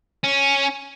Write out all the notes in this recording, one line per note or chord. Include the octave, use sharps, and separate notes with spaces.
C#4